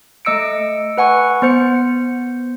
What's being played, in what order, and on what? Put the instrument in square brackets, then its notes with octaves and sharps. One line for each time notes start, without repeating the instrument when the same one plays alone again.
[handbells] A3 D#5 E6 C#7 D7
B4 F#5 G#5 C#6
B3 C5 C#7